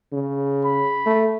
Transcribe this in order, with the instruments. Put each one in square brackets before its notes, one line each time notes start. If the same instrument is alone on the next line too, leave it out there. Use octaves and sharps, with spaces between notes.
[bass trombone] C#3
[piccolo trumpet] B5
[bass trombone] A3